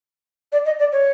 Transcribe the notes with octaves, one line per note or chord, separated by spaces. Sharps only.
D5
D#5
D5
C#5